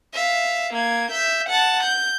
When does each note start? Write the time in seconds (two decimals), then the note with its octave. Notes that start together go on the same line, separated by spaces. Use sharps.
0.14 E5 F5
0.74 A#3 G#6
1.11 E5 G6
1.49 F#5 A5
1.83 G6